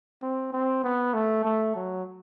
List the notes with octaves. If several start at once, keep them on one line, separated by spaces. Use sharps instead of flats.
C4
C4
B3
A3
A3
F#3